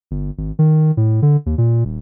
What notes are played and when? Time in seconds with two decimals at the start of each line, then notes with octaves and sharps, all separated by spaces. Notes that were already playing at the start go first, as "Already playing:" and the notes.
0.11 G1
0.38 G#1
0.59 D#3
0.97 A2
1.22 D3
1.46 D#2
1.58 A#2
1.85 D#1